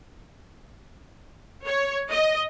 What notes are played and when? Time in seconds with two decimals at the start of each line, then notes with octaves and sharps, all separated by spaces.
1.66 C#5
2.12 D#5